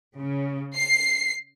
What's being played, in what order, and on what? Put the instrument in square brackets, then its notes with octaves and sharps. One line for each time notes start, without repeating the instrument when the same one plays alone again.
[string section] C#3
C7